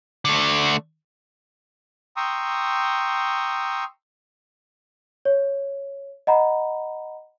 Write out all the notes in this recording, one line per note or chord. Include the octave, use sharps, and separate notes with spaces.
D3 A3
G5 A#5 C6 C#6 D#6 E6
C#5
D#5 F#5 A#5 B5